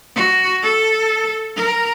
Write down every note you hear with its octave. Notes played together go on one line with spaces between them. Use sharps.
F#4
A4
A#4